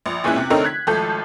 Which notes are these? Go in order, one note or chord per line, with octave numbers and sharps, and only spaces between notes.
A#1
E2 A#2 G#3 C#4 E4 F#6
C3
D3 A3 C4 D#4 A#4 C#5
F#6 G#6 B6
G#1 F3 A3 A4 G6